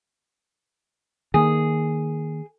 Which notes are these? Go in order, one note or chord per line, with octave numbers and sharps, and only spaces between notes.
D#3 A#3 G#4